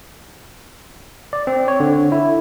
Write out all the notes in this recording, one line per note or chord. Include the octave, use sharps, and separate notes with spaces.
D5
C4
C#5
D3
E4